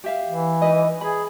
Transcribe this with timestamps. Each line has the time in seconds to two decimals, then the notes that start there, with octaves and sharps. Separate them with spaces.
0.04 G4 E5 F5
0.27 E3
0.62 D#4 B4 D#5
1.01 G#4 B5